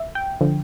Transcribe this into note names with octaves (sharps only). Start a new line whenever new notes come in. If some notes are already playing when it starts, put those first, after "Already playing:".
Already playing: E5
G5
D3 F3